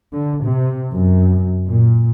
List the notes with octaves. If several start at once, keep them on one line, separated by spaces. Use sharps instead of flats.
D3
C3
F#2
A#2